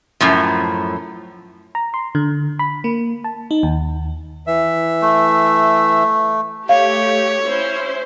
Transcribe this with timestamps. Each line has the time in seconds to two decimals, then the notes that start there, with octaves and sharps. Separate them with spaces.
0.21 F#2 A2 F3
1.75 A#5
1.94 C6
2.15 D3
2.59 B5
2.84 A#3
3.24 A5
3.51 D#4
3.63 D#2
4.47 E3 E5
5.02 A3
6.69 A3 G4 C#5 F5
7.46 C#4 E4 C5